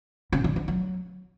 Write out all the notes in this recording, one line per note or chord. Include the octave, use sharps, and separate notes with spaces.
C#3
D3
D3
F#3